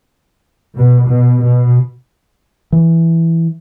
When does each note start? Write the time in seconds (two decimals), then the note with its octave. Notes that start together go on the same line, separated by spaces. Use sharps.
0.74 B2
1.06 B2
1.42 B2
2.72 E3